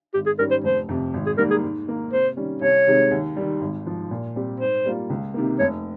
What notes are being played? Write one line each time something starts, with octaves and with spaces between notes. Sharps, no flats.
G#1 G4
G#4
G#2 G3 C#4 A#4
C5
F1 C5
F2 C3
G#1
G#4
G#2 G3 A#3 A#4
G#4
G#2
D#3 A#3
C3 C5
D#3 G3 C#4
C2 C#5
C3 D#3 G#3
D#2
D#3 G3
G#1
G#2 F3
A#2
G3 C4 G4
G#2 C5
G3 A#3 F4
C#2
C3 D#3 A#3
F1 C#5